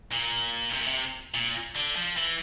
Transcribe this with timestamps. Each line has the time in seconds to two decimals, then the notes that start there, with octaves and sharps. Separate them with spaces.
0.12 A#2
0.74 C3
0.81 A#2
0.87 C3
1.34 A#2
1.76 D3
1.96 F3
2.17 E3